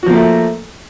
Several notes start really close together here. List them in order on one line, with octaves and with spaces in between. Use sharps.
F#4 F3 A#3 A3